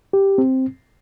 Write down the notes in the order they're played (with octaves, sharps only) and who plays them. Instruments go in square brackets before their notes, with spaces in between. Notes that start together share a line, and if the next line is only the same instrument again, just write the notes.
[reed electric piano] G4
C4